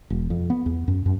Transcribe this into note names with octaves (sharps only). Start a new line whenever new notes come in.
E1
F2
B3
E2
F#2
F#2